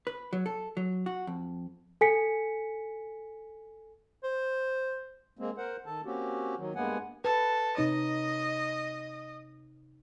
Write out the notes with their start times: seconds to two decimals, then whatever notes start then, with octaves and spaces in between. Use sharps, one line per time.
0.07 B4
0.33 F#3
0.46 A4
0.77 F#3
1.06 F#4
1.27 F2
2.01 A4 G#5 B6 C#7
4.24 C5
5.39 G#3 A#3 C4
5.57 A#4 C5 F#5
5.86 D#3 A4 A5
6.05 A#3 C4 C#4 F#4 G4
6.58 D#3 F#3
6.75 G2 G#3 A#3 B3 F#5 G#5
7.25 A4 B4
7.77 C3 D#4 C#5 D#5